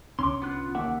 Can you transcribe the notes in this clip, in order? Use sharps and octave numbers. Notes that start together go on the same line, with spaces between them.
C2 D3 C#4 C6 D6
B3 F4 F#6
D#2 A#3 E5 F#5 D6